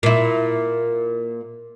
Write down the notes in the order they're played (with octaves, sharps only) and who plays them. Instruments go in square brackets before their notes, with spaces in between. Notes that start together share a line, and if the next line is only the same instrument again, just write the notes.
[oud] A#2 E4